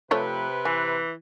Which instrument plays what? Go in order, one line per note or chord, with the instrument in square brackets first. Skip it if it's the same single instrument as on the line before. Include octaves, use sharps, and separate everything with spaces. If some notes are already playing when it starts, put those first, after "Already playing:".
[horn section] C3 B4 [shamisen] F3 A3 C#5
[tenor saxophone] E3 [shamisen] G#5